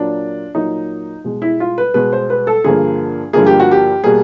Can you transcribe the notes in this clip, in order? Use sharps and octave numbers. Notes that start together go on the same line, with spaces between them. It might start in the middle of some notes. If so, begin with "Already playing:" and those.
Already playing: A#2 F#3 A#3 D4
A#2 F#3 A#3 D#4
B2 G#3
E4
F4
B4
B2 G#3 B4
C5
B4
A4
G2 D3 F3 A#3 G#4
G2 D3 F3 A#3 G#4
G4
F#4
G4
B2 G3 A#3 G#4